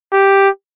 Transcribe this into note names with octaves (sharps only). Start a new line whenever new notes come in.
G4